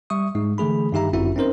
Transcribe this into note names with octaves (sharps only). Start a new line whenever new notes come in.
G3 E5 C#6 D#6
G#2 G#3 D#4
D3 E3 A3 G#4 B5
G2 D#3 D#4 G4 E5 A#5
G1 F#2 C4 E4 F#4 E5
C4 C#4 D#4 A#4 C5